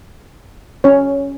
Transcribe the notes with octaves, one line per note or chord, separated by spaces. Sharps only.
C#4 C#5